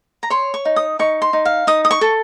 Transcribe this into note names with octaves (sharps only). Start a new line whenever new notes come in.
A#5
C#5 C6
C#6
D#4
D#6
D#4 C#6
C6
D#4
F5
D#4 D#6
D#6
C#6
A4